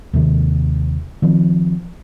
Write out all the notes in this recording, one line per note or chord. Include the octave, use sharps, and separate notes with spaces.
D#2 C3 D#3
D#3 F3 C4